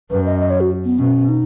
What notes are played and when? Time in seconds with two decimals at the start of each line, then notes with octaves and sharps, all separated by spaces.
0.11 F#2 B4
0.26 D#5
0.40 D#5
0.50 C#5
0.61 F#4
0.85 B3
0.99 B2 C#4
1.29 D#4